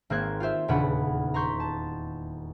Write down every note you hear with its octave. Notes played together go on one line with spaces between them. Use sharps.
G#1 A#3 C4 C5 F#6 G#6
F4 G4 C5 E5
D#1 E2 C#3 D4 B4 F#5
A#5 C6 C#6 G6 B6
A5